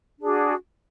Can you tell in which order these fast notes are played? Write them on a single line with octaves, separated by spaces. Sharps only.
D4 G#4 F#4